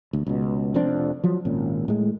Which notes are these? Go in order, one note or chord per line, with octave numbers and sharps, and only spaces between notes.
D2
C#2 B2
F1 F2 C4 D4
F3 F#3
G#1 A#2 C#4
A2 G#3